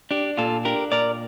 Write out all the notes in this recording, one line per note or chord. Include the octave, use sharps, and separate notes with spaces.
D4 G4
A#2 F4 A4
D4 G4 A#4
A#2 A#4 D5